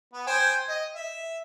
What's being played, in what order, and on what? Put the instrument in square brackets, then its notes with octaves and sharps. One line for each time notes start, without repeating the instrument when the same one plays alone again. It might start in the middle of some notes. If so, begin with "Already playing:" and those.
[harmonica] B3
C5 G5 G#5
D#5
E5